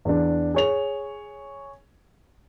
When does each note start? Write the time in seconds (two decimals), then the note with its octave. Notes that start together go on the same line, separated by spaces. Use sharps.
0.05 E2 D4
0.54 G#4 C#5 F7